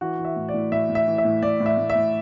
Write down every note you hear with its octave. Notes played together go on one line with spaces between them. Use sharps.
E3 F#4 F#5
E3
E5
A2
D5
A2
A2 E5
A2
E5
E3
E5
A2
A2 D5
A2
E5
A2
E5
A2